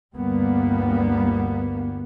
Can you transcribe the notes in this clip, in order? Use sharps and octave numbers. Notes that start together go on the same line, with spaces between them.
G1 D2 G3 A#3 B3